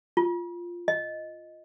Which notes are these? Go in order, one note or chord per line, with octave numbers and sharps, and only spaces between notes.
F4
D#5